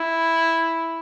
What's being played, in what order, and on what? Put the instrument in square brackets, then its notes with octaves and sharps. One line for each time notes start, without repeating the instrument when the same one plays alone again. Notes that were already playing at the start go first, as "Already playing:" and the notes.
Already playing: [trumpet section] E4